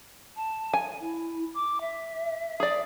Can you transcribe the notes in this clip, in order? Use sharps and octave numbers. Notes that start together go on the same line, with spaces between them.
A5
G#5
E4
D6
E5
G#4 D5